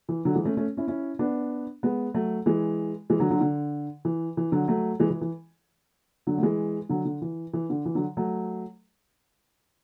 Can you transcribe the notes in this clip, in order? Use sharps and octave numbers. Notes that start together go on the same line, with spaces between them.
E3
D3 F#3
E3 G#3
A3 C#4
A3 C#4
C#4 E4
C#4 E4
B3 D4
G#3 B3
F#3 A3
E3 G#3
E3 G#3
D3 F#3
D3 F#3
D3
E3
E3
D3 F#3
F#3 A3
E3 G#3
E3
E3
D3 F#3
A3
E3 G#3
D3 F#3
D3
E3
E3
D3
E3
D3 F#3
F#3 A3